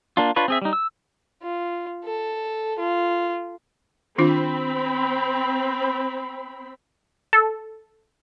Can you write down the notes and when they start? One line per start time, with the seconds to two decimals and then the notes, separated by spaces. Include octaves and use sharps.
0.17 A#3 D4 F4
0.36 D4 F4 B4 C#5
0.48 C4 G#4 E5
0.62 G3 D#4
0.73 E6
1.43 F4
2.05 A4
2.79 F4
4.18 D#3 C4 D4 F4 B5
7.33 A4